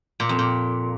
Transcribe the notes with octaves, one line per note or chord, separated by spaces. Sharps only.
A#2
F2
A#2